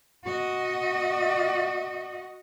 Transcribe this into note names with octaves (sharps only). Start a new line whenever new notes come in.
F#4 D#5